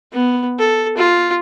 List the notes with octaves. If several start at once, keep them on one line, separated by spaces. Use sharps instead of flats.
B3
A4
F4